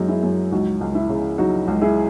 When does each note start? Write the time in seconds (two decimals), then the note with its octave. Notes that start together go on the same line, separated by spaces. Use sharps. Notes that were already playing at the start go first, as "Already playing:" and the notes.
Already playing: F#2 G#3 D#4 F#4
0.09 E4 G#4
0.23 F#2
0.52 C#2 D#4 F#4
0.81 C#2
0.95 E4
1.09 C#3
1.38 F#3 D#4 F#4
1.67 C#2
1.82 E4 G#4